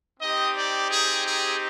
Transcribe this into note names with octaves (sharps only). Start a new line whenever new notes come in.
C4 D#4 G4 D#5
D5
G#4
G#4